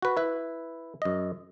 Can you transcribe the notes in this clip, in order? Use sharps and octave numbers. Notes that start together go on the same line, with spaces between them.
F#4 B4
E4 B4
F#2 D#5